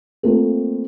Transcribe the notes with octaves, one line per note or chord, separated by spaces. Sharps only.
A3 A#3 C4 F4 A4 A#4